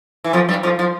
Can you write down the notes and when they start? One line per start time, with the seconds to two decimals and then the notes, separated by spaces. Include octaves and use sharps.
0.24 E3
0.33 F2 F3
0.49 G2 G3
0.63 F2 F3
0.79 F3